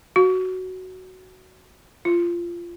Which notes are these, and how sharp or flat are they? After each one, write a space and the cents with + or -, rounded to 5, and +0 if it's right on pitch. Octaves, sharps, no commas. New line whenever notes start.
F#4 +10
F4 -15